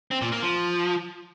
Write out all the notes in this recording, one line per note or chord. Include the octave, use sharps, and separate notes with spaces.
C4
A#2
A#3
F3